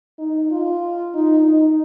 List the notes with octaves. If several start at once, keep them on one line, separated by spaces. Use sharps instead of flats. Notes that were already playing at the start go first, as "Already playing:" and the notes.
D#4
F4
D#4
D#4